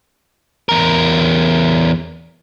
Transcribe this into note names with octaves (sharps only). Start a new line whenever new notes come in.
E2 A#4